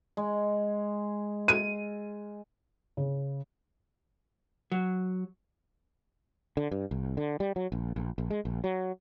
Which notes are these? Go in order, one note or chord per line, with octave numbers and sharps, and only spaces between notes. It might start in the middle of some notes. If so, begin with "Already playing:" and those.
G#3
D#7
C#3
F#3
D3
G2
C2
D3
G3
F#3
A#1
A#1
A#1
G#3
A#1
F#3